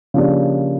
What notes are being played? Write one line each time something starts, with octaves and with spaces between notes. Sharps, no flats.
C#3 F3 A#3 D4 G4